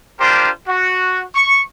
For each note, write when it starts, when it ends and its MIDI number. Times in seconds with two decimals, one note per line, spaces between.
0.20 0.50 62
0.20 0.50 65
0.20 0.50 67
0.20 0.50 70
0.20 0.50 72
0.68 1.24 66
1.35 1.62 85